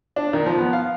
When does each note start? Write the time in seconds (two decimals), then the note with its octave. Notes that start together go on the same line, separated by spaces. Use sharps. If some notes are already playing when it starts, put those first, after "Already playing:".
0.16 D4
0.33 D#3
0.46 F3
0.58 B3
0.73 F5